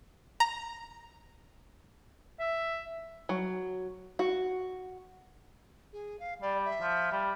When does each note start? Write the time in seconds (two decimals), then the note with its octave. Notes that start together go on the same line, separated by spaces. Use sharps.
0.40 A#5
2.40 E5
3.29 F#3
4.19 F#4
5.93 G#4
6.20 F5
6.42 G3 D5
6.65 E5
6.81 F3
7.12 G3